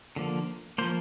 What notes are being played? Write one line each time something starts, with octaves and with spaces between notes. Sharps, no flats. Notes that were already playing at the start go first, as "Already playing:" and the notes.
D3 F3 A#3
F3 A#3 C5